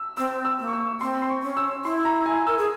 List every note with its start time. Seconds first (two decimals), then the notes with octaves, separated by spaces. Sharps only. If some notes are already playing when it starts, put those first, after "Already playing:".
Already playing: E6
0.17 C4 E6
0.45 E6
0.59 A#3
0.67 C#6
0.73 E6
1.01 C4 C6
1.22 C6
1.30 C#6
1.43 C#4
1.57 E6
1.84 E4 C6
2.05 A#5
2.26 G#5
2.47 A#4 E6
2.58 G#4